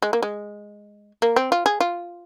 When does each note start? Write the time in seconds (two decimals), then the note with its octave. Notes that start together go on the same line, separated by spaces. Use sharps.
0.02 G#3
0.13 A#3
0.22 G#3
1.22 A#3
1.36 C4
1.52 F4
1.66 G#4
1.80 F4